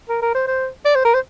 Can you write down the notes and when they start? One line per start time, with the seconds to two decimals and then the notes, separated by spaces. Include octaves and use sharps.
0.09 A#4
0.22 A#4
0.35 C5
0.47 C5
0.85 D5
0.95 C5
1.05 A#4
1.14 C5